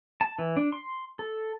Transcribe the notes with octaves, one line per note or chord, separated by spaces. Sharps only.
A5
E3
D4
C6
A4